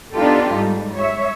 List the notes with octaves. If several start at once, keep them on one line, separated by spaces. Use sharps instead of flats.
B3 D4 D#4 F4 G4 A4
G#2 G3
C#5 E5